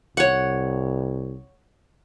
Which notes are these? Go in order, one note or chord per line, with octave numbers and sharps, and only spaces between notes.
C2 C#5 F#5